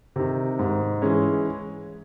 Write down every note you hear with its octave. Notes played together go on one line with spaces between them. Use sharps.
C3 D#3
G#2
E3 G#3 C#4